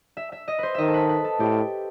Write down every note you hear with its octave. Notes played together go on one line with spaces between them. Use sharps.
E5
E5
D#5
B4 C5
D#3 D#5 E5
A4
B4
B4
A4
A2 G4